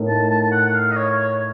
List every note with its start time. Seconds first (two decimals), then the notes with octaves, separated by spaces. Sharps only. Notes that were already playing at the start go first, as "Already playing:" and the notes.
Already playing: A2 A3 D#4 A#4
0.08 A5
0.30 A5
0.41 A5
0.52 F#5
0.67 F#5
0.74 F5
0.91 D#5
0.96 C#5
1.18 C#5